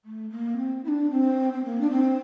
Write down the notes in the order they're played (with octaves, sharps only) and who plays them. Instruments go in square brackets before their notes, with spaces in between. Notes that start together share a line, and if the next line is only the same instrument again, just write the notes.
[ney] A3
A#3
C4
E4
D4
C4
C4
A#3
D4
C4